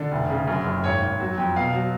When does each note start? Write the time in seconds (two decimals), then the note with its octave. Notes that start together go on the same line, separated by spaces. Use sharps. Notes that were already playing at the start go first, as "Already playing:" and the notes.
Already playing: D3 D5
0.12 F1
0.30 C#3
0.47 F#2
0.65 F#1
0.84 G#1 C#5
1.01 G#1
1.20 F#3
1.38 F2
1.56 B2 F5
1.74 F#3